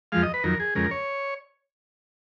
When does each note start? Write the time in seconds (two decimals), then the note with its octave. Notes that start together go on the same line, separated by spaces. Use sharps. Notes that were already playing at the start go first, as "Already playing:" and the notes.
0.12 F2 F3 G#3 F5
0.23 D#5
0.34 B4
0.44 F2 D#3 F#3 A#4
0.60 G#4
0.75 F2 C#3 G#3 A#4
0.91 C#5